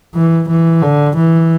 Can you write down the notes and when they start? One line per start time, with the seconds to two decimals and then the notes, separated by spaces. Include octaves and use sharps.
0.15 E3
0.48 E3
0.82 D3
1.16 E3